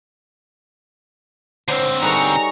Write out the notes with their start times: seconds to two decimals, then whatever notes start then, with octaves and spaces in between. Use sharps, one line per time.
1.68 D3 C4 C5 C#5 A#5
2.02 G3 D#4 G#4 A4 B4 A#5 C#6